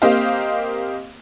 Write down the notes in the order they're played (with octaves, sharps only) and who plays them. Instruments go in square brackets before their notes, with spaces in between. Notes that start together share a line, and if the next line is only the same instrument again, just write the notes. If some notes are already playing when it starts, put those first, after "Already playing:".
[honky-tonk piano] A#3 C4 G4 C5 D#5 F5